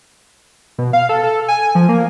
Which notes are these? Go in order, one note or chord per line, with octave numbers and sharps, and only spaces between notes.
B2
F5
A4
A4
G#5
F3
A#3